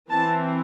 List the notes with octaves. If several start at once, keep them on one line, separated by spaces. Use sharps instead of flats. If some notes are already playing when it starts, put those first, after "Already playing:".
E3 C4 A5